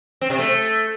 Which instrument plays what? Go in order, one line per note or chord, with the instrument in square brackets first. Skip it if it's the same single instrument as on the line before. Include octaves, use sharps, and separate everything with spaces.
[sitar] C4
C3
A3